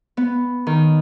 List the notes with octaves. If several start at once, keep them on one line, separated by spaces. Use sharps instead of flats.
B3
D#3